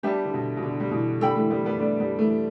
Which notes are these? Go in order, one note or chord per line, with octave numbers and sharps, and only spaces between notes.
G3 B3 D4 G4 E5 A5
D3
B2
B2
D3
G3
B2 E3
D3 G3 A4 G5 B5
E3 A3
G3 B3
G3 B3
A3 D4
G3 B3
E3 A3